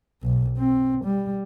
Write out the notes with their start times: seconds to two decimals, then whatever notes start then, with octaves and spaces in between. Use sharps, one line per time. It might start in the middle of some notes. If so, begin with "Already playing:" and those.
0.23 B1
0.58 C4
1.05 G3